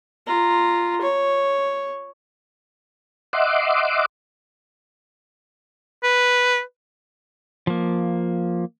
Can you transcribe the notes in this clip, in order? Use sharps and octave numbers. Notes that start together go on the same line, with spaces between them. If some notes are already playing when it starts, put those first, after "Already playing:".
F4 A#5
C#5
D#5 E5 F#5 C6 D6
B4
F3 A#3